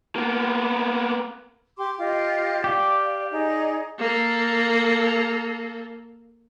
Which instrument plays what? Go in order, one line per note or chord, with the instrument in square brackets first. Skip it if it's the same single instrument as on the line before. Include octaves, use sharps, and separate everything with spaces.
[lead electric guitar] A#3 B3
[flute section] G4 C6 D6
F4 G4 D#5
[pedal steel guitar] G4 [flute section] D5 F5
[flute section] D#4 G#4 D5
[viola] A#3 A4